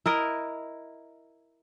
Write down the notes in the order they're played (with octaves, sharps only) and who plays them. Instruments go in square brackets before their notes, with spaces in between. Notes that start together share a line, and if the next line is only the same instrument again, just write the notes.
[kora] E4 A#4 D#5